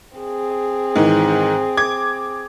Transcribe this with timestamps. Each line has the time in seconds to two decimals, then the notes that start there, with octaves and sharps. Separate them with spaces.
0.18 C4 G#4
0.96 G#2 D#3 E3
1.77 D6 G#6